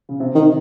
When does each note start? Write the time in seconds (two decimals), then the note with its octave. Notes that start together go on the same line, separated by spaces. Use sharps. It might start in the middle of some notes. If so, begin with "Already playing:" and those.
0.09 C#3
0.20 C3
0.35 D#3